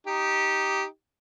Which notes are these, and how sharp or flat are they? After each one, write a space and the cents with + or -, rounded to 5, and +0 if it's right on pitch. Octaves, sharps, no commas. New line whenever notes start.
D#4 +0 G4 -10